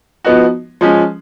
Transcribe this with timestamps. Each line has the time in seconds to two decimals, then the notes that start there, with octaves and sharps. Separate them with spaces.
0.25 F3 B3 D#4 F#4
0.81 F3 G#3 C#4